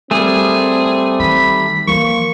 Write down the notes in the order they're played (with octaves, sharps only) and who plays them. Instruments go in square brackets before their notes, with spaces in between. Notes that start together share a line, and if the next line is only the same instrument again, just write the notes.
[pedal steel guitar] G3 A3 [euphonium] C4 [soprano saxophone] G#4
[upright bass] D#3 [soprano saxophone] B5
[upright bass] E3 F3 [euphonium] A#3 [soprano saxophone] C#6